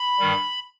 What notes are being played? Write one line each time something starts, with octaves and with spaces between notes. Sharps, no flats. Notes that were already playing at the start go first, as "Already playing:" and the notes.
Already playing: B5
G2 D#3 G3